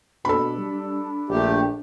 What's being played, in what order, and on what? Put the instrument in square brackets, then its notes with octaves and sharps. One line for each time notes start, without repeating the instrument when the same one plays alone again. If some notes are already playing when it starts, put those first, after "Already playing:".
[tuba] B2 [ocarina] D4 [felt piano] A4 B5
[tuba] G3
[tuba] A#1 [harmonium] A3 G4